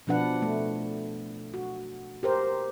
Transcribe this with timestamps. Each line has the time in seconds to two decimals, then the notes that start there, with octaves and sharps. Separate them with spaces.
0.07 B2 F3 D4 B4 F#5
0.42 A3
1.54 F#4
2.23 G4 A#4 C5